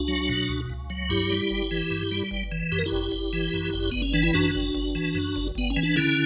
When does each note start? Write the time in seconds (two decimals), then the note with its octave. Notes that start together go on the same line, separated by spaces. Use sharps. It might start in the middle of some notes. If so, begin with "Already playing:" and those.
Already playing: C#2 D4 F#4
0.08 F#3
0.29 B2
0.49 C#2
0.70 C#2
0.90 F#3
1.09 G2 E4 G4
1.30 G3
1.50 G1
1.71 E3
1.90 G2
2.11 G3
2.31 G1
2.52 E3
2.72 F#2 G4
2.79 A#4
2.86 E4 G4
2.92 G1
3.12 G1
3.33 E3
3.54 F#2
3.73 G1
3.92 G1 B3
4.02 C#4
4.13 E3 D4
4.23 E4
4.34 F#2 D4 F#4
4.55 G1
4.74 G1
4.95 E3
5.15 F#2
5.36 G1
5.55 G1 B3
5.70 C#4
5.76 E3
5.83 D4
5.96 D3 C#4 E4